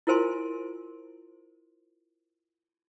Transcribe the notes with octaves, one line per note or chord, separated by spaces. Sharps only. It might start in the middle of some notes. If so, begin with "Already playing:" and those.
E4 F4 A#4 C5 G#5 C6